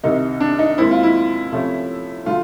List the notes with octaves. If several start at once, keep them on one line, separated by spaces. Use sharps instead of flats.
C2 C3 D#3 D#4
D4
D#4
D#2 D#3 G#3 C4 E4
F4
E4
C3 F3 A3 C#4
D3 F#3 A3 F4